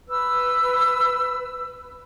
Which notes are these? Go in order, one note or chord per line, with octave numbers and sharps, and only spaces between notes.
B4 E6